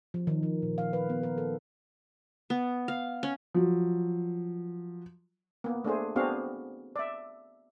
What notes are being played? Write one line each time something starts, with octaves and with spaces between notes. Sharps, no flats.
F3
D#3
F3
A#2
F5
B4
B3
A#4
A4
B3
F5
C#4
F3 F#3
A#3 B3
A3 D4 G#4 C5
B3 C4 D4 F#4 G#4 F5
D5 E5